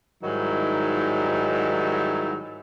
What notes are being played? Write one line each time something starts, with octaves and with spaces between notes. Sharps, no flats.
G#2 D#3 F#3 G3 E4